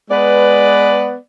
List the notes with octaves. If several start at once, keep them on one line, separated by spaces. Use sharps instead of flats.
G#3 B3 B4 D5